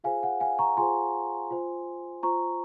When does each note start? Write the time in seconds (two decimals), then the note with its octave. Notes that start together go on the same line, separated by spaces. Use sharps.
0.04 F4 G#4 C5 F5 G#5
0.23 F#5
0.40 F5 G#5
0.59 A#5 C#6
0.77 F4 G#4 C5 G#5 C6
1.51 F4 C5
2.23 F4 C5 A#5 C#6